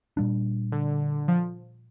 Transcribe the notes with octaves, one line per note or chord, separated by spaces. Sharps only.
A#2 G3 D4
D3
F3